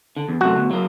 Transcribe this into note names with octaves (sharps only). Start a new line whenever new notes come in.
D3
E2
F#2 C3 A3 F#4
D2 B2
F#3 A#3